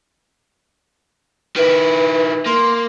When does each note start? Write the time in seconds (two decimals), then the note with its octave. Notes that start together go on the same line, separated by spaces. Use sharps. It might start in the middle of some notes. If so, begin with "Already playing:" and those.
1.56 D#3 E4 B4
2.46 A#3 C6